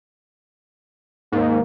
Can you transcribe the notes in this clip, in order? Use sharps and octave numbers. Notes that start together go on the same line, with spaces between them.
D#2 G#2 A#3